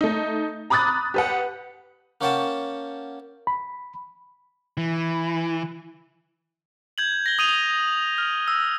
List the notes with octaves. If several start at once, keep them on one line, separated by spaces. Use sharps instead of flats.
A3 D#4
A#5 B5 D6 D#6 F#6 A6
G4 B4 F#5
A#3 C#4 C#5 F#5 G5 A5
B5
E3
G6 G#6 F#7
A#6 G7
D#6 D#7 F7
F6
E6